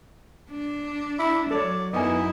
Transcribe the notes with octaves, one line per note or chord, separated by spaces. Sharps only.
D4
E4
F#3 A4 C#5 D5
F#2 B3 D#4 E4 G#5